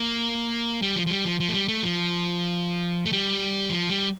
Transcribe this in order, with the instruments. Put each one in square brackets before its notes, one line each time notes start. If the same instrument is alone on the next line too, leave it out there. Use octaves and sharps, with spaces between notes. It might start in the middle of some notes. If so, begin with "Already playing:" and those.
Already playing: [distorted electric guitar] A#3
G3
F3
F3
G3
F3
F3
A3
G3
A3
F3
A3
G3
F3
G3